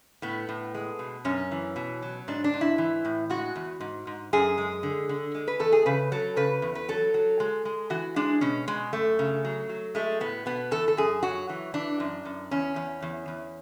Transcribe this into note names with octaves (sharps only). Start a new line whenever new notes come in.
A2 B3
A2
G#3
B2
F#2 C#4
E3
B2
F#3
G#2 D4
D4
G#2
E4
E3
A2
G#3 F#4
E2
G#2
G#2
F#2 G#4
G#3
D3
D3
G#3
B4
E2 A4
G#4
C#3 B4
F#3 A4
C#3 B4
E2
B4
F#3 A4
F#3
G#3
G#3
E3 F#4
G#3 D4
B2 C#4
B2 G#3
F#2 A3
C#3
F#3
F#3
G#3 A3
A2 B3
B2 B3
E2 A4
A4
F#2 G#4
F#3 F#4
E3
E3 D4
F#2
F#2
E2 C#4
E2
E2
E2